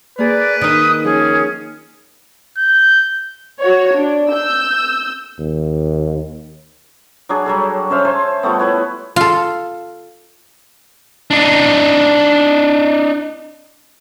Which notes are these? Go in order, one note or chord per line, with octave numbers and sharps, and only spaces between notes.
A#3 G#4 B4 D5
D#3 D#4 D#6
F3 C#4 G#4
G6
F#4 C#5
D4
E6 G6
D#2
F#3 D4 G#4
F#3 G3 A4
C#4 C5 E5 F5
C5 E5 G#5 A5
F3 G3 A3 B3
E4 B4 C#5
F4 A4
D4 D#4